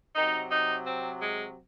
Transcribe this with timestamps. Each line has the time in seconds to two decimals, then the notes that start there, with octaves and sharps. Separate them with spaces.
0.16 C3 F#3 D#4
0.51 D#4
0.87 C4
1.22 G#3